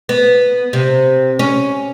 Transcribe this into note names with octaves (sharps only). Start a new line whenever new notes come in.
B3
C3
C#4